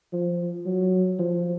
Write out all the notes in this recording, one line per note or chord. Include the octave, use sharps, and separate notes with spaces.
F3
F#3
F3